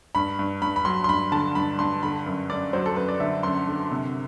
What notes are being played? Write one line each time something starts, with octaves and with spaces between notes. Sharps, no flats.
G2 B5
G2
G2 B5
B5
F#3 C6
C6
G2 B5
D3 A5
G2 B5
G2 C6
D3 B5
F#2
F#2 D5
F#3 C5
A4
F#2 B4
D5
D3 E5
F#2 C6
D3
C3